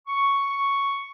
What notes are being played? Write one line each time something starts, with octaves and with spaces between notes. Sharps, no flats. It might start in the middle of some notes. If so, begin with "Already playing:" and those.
C#6